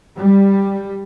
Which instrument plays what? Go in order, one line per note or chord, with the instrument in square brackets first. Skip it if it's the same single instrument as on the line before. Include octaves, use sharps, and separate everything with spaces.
[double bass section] G3